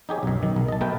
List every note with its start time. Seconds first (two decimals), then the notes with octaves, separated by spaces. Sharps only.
0.09 D#4 G4 G#4 C#5
0.23 B1 F#2
0.43 D#3
0.56 B1
0.69 D#5 A5
0.81 B2 A3 A#4 B4 G5